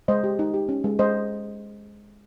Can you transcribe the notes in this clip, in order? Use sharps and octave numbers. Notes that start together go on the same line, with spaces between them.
G#3 C5 D#5
G4
D#4
G4
C#4
G#3
G#3 C5 D#5